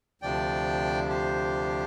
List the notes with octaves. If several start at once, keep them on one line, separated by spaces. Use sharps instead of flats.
D2 C3 F3 D4 D5 G5
G4 C5